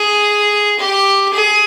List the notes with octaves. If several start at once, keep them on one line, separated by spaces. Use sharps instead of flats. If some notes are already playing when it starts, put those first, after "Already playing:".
Already playing: G#4
G4
G#4